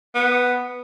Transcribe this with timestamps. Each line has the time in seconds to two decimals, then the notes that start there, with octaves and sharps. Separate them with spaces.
0.15 B3